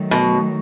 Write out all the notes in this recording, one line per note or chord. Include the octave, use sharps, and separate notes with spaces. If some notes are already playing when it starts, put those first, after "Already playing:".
Already playing: D#3 F#3 A3
B2